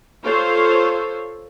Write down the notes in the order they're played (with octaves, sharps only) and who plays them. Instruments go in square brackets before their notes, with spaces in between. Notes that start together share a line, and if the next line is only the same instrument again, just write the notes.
[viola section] F4 A4 C5 C#5